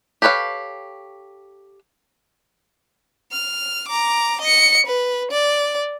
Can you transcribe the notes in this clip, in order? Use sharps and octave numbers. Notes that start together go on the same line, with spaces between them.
G4 A4 B4 C#5 F5
F6
A#5 D6
D#5 C#7
B4
D5